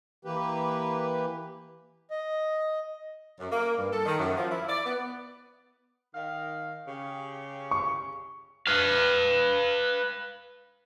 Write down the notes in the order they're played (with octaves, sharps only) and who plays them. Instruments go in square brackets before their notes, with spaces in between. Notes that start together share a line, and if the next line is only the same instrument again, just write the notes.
[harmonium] E3 A#3 G4 B4
[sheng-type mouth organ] D#5
[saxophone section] F#2
A#3
G2
A4
D#3
F#2
F3
E4
D5
B3
D#3 F5
C#3 G4
[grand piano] C#6
[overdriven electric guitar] B4 F5